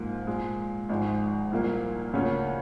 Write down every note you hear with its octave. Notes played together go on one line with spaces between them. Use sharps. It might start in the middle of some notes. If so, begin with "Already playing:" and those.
Already playing: G#2 F3 A#3
A#2 F3 G#3
G#1 G#2 F3 G#3
C2 A#2 F3 A#3
D2 C#3 F3 A#3 C#4